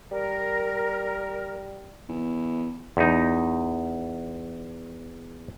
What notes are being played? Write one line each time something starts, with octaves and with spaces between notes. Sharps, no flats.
G3 A#4
E2
E2 D#4